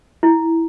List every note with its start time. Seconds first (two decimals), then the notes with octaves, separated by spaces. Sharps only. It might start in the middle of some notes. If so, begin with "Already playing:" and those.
0.23 E4